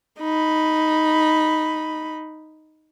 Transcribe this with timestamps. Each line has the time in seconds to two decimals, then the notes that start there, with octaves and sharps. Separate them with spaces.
0.20 D#4 B5